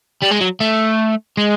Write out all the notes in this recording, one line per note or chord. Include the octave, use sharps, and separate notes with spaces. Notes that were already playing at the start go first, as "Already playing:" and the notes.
G3
G#3
F#3
A3
G#3